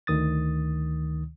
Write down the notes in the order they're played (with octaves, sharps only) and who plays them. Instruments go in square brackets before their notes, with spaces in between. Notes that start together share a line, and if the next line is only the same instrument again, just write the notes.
[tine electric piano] D2 D#3 D#6 A6